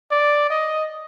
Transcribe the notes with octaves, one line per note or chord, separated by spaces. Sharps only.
D5
D#5